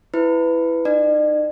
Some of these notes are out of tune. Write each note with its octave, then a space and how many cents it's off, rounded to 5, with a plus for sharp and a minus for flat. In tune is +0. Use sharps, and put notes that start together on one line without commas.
E4 +5 B4 +15
D#4 -35 D5 +45